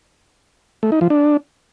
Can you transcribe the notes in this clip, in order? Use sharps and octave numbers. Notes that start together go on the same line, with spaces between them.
A3
D#4
F3
D4